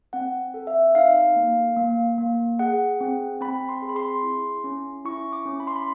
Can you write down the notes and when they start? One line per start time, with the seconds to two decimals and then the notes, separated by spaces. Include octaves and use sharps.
0.13 C4 F#5
0.54 A4
0.67 E5
0.95 D#4 F5
1.36 A#3
1.77 A#3
2.18 A#3
2.59 G#4 F#5
3.01 C4
3.41 C4 B5
3.69 C6
3.82 G#4
3.89 B5
3.96 C6
4.23 E4
4.64 C#4
5.05 E4 C#6
5.33 D6
5.46 C#4
5.60 B5
5.67 C6
5.76 B5